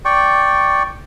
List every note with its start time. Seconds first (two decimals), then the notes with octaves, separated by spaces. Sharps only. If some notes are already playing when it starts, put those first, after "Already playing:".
0.05 D5 G5 C#6